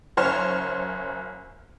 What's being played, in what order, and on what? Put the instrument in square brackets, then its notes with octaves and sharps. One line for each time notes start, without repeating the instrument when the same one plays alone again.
[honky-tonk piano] F#1 F#2 C5 C#5 F6